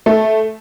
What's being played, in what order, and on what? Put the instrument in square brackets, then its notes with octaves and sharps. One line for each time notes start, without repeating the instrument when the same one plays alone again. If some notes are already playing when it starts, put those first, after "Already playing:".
[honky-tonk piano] A3